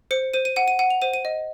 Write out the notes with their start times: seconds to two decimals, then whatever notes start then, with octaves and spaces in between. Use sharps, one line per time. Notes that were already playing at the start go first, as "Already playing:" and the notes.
0.11 C5 C#7
0.34 C5 D#7
0.45 D#7
0.56 F#5 D#7
0.68 D#7
0.79 F#5 D#7
0.90 F7
1.02 C5 D#7
1.14 D#7
1.25 D#5